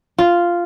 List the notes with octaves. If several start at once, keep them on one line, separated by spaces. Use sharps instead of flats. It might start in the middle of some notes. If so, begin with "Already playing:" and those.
F4